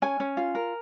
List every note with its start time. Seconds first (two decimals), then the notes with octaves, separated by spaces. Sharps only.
0.02 C#4 G#5
0.20 C#4
0.37 F4
0.55 A#4